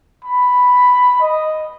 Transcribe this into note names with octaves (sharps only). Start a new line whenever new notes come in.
B5
D#5